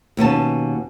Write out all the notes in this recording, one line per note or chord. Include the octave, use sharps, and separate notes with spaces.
D#2 B2 C#4 A5